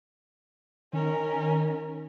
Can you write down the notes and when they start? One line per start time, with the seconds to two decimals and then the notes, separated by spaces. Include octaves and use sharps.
0.93 D#3 C#4 A#4